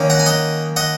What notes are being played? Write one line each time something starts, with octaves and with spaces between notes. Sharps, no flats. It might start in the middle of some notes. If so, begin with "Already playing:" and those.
Already playing: D#3 A#3 C#4
F#5 A#5
G#5
D#5 F#5
D#5 F#5